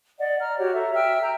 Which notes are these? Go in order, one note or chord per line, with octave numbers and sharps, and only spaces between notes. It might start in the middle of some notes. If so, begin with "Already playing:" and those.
D5 D#5 F#5
A#5 F6
F#4 G4 C#5 F#5
A4 E5 A#5
E5 G5 E6 F6
G5 A#5